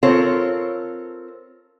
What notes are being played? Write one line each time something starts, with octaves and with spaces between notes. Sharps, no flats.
C4 F4 A4 A#4 C#5